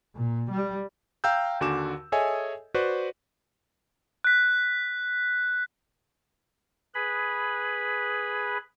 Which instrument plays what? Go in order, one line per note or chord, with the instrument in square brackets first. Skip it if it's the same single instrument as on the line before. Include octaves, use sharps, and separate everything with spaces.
[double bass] A#2
G3
[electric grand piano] F5 G5 A#5 E6 G6
D#2 D3 F#4 G#5 D6 E7
G#4 A4 C#5 D#5 E5 G#5
F#4 B4 C5 D5
[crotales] F#6 B6
[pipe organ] G#4 B4 B5